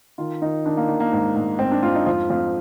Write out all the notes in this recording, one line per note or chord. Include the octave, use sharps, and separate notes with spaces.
D#3 F4
D#3 D#4
D#3 D4
A#3
D#3
A#3
G#2
G#2
G#2 C4
D4
G#2 F4
D#4
F2 F4
F2 F4